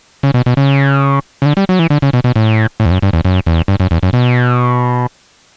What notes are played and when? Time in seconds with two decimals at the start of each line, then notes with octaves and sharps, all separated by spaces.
0.23 C#3
0.34 B2
0.46 B2
0.57 C#3
1.42 C#3
1.46 D3
1.57 G3
1.69 F#3
1.79 E3
1.90 D3
2.02 C#3
2.13 B2
2.24 B2
2.36 A2
2.80 A2
2.86 E2
2.91 F#2
3.02 G2
3.13 E2
3.25 F#2
3.46 E2
3.68 G2
3.80 F#2
3.91 E2
4.03 F#2
4.13 B2